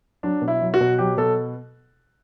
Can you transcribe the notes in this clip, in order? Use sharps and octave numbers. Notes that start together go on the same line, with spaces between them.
F#3 D4
B2
E4
F#3
F#4
B2
F#3 G4
B2 A4